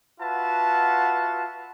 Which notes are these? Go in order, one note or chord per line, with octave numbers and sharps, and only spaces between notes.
F4 F#4 B4 E5 F#5 A5